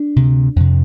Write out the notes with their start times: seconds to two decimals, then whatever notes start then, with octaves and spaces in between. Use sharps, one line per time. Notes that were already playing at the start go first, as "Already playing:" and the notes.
Already playing: D4
0.16 D2 C3
0.56 F2 C3